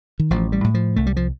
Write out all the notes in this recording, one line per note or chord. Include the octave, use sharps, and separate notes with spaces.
D#3
A1 F3
G3
A2
F3
C2 A3
G3
F3